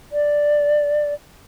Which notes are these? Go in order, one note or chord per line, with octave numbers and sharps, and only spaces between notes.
D5